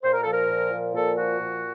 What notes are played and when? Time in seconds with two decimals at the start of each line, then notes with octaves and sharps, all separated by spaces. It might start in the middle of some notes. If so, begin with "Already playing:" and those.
0.04 A#2 C5
0.13 A#4
0.22 F3 A4
0.32 A#4
0.48 A#2
0.72 F3
0.94 A#2 A4
1.16 F3 F#4
1.40 A#2